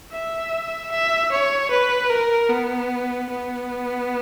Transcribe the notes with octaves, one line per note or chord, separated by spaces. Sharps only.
E5
E5
C#5
B4
A#4
B3
B3